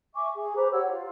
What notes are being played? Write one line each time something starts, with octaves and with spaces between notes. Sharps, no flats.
E5 G#5 C#6 D6
G#4
B4 C5 A#5 D6
G4 C#5 F#5 E6
F4